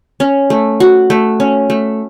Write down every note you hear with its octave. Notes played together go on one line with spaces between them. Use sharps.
C#4
A3
F#4
A3
C#4
A3